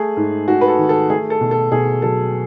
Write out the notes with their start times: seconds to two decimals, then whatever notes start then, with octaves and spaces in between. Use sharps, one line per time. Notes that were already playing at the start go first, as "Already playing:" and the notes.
Already playing: A3 G#4
0.17 G#2
0.48 G#2 F#4
0.61 B4
0.68 A4
0.78 D#3
0.89 A4
1.10 A3 G#4
1.30 A4
1.41 B2
1.51 A4
1.72 B2 G#4
2.02 F#3 A4